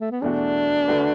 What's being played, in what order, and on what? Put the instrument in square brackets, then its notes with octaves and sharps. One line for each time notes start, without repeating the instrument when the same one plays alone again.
[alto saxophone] A3
B3
[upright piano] E2 B2 A3 F#4 [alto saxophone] D4
[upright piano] D3 A3 F#4 B4